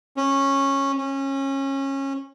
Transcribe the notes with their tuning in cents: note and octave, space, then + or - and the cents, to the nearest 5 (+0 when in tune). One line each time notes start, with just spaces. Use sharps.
C#4 -15
C#4 -25